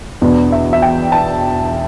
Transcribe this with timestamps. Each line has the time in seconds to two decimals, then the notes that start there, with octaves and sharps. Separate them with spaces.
0.21 E2 B2 B3 D4
0.52 E5
0.73 E5
0.82 G5
1.12 A5